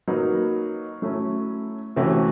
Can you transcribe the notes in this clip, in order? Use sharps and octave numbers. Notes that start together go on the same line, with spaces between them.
F#3 A#3 D#4 F#4 B4
F#3 A3 C#4 E4
C3 E3 A3 C#4 F#4